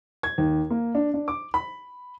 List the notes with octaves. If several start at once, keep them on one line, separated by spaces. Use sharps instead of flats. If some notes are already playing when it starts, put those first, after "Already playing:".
G#6
D#2
A#3
D4
D4
D6
B5